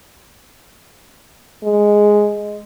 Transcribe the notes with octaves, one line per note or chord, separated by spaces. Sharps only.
G#3